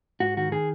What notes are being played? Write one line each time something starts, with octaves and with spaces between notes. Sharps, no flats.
G#2 F#4
D#3 F#4
D#3 G#4